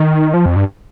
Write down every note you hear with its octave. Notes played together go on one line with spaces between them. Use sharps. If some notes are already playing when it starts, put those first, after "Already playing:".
Already playing: D#3
F3
F2
G2